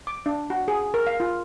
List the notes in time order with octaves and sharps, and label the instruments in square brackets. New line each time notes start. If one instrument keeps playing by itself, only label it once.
[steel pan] D6
D4
F#4
G#4
A#4
F5
F4